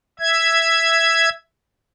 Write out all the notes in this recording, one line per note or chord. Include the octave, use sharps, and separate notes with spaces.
E5 G#6